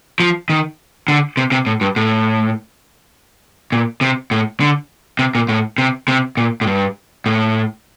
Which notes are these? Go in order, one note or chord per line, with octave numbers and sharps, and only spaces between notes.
F3
D#3
D3
C3
C3
A2
G2
A2
A#2
C3
A2
D3
C3
A#2
A2
C3
C3
A#2
A2
G2
A2